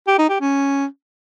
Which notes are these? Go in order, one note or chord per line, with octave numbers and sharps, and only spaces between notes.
G4
D#4
G4
C#4